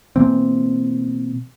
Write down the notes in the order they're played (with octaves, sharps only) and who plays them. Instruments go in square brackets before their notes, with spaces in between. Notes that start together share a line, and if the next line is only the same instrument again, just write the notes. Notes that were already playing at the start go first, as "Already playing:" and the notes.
[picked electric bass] B2 E3 A#3 C4